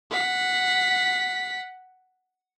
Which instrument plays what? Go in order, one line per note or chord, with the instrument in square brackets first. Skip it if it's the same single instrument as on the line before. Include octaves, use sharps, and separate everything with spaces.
[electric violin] F#5 B6